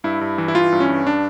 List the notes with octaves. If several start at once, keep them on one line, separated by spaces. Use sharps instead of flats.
G2 E4
G2
E3
E4
E3 F4
G2
C#4
G2
D4